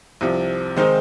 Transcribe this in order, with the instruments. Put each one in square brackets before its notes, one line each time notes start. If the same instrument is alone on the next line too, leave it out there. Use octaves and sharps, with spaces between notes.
[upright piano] C2 C3 F3
D#3 G#3 C4 D#4 C5